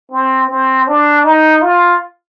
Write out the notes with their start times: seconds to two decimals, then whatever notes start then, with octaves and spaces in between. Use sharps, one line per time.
0.12 C4
0.50 C4
0.88 D4
1.24 D#4
1.62 F4